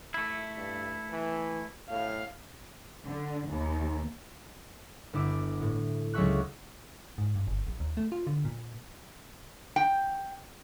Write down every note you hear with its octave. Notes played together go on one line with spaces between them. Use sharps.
A3 E4
G2
E3
A2 F5
D3
D#2
G1 E4 D6 D7
A2
C#2 F#3 G#4 E5 C#6 F#6
G#2
G2
G1
A#1
D#2
A3
F4
D3
A#2
G5